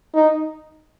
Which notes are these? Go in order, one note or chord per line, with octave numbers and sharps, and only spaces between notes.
D#4